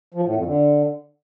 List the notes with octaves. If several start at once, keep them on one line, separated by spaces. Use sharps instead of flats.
F3
A2
F2
D3